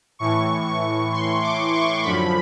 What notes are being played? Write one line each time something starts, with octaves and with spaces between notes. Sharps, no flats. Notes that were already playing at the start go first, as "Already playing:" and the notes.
A2 E3 C#6
C#6
C6
D6
C#6
F#2 D3 F3 B5